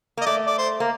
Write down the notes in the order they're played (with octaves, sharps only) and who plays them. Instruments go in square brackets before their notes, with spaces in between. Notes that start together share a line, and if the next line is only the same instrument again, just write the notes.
[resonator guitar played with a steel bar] A#3
[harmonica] D#5
[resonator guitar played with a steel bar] A3 [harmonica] D5
[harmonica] D5
C5
[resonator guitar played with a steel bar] A#3